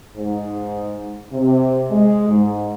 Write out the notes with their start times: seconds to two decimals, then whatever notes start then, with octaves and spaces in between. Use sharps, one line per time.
0.15 G#2
1.32 C3
1.90 G#3
2.28 G#2